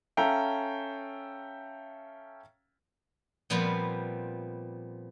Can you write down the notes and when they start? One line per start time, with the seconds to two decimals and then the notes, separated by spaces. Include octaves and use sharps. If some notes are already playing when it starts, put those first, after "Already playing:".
0.17 C#4 A4 E5 F5 G5 A#5
3.50 A#2 F3 G3 B3 C4